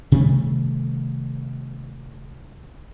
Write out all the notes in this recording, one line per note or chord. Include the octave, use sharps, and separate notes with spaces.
C3 D#3 G3 A3